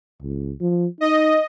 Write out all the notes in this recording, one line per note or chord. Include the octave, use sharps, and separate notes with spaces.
C#2
F3
D#4 D#5